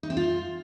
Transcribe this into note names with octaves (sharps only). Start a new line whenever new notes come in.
D#4
C4
F4